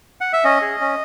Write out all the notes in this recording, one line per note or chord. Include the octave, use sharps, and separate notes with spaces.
F#5
E5
C#4 D#5
G#4
C#4